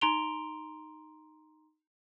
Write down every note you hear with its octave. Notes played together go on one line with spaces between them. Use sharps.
D#4 A#5 C6 D7 F7 G7